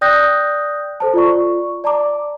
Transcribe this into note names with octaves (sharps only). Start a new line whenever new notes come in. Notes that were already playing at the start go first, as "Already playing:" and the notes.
D5 G5 D#6 F#6 G6 A#6
A4 C5 A5
F4 D5 C#6
D5 A5 A#5 D6